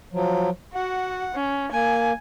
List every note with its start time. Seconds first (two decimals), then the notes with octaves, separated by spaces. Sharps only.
0.13 F3 F#3
0.74 F#4 F#5
1.35 C#4
1.72 A#3 G#5